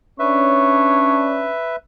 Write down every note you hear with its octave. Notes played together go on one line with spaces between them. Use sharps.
C#4 D4 B4 C#5 E5